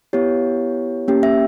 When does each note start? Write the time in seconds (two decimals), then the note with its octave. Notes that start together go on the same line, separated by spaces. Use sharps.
0.13 B3 E4 G4 C#5
1.08 A#3 C#4 G4
1.23 E5